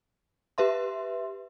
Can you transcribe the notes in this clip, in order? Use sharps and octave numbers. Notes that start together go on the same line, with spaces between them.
G4 B4 E5 C6